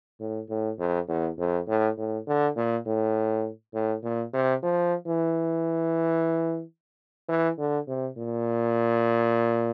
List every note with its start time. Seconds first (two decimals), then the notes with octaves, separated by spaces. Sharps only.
0.20 A2
0.49 A2
0.79 F2
1.08 E2
1.38 F2
1.68 A2
1.97 A2
2.27 D3
2.56 A#2
2.86 A2
3.74 A2
4.03 A#2
4.34 C3
4.63 F3
5.07 E3
7.29 E3
7.58 D3
7.88 C3
8.17 A#2